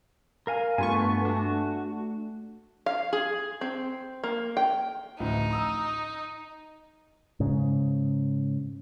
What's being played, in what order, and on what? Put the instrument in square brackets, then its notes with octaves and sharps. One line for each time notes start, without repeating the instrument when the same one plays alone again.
[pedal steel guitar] A#4 F5 G#5
[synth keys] G2 F4 C#6 [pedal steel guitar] A3 B3 G#5
[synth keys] A3 D4 [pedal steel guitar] F#4
[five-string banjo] F5
G#4
C4
A#3
G5
[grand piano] A1 D2 F3 [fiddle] D#4
[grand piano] A#5 D#6 E6
[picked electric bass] G#2 C#3